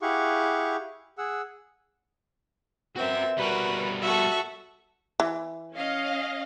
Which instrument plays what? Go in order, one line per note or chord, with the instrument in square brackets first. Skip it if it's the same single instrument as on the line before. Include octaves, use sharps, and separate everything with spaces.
[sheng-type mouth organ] E4 G4 G#4 F5 F#5 C#6
G#4 F#5 E6
[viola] C4 [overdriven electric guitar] F#4 A#4 [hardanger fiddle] B4 E5
[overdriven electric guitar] B2 G3 [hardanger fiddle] F#4 A#4 [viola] B4
[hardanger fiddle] F#4 A4 [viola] E5 C#6
[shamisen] E3
[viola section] C#4 D#5 F5